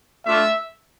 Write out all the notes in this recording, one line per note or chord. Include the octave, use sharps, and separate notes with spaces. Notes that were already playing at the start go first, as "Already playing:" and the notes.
A3 D4 F4 E5